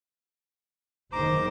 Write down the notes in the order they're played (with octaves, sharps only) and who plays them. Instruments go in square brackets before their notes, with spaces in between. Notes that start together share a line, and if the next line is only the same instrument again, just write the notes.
[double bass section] F#1 E2 D#3 [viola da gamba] C5 [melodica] A#5 D6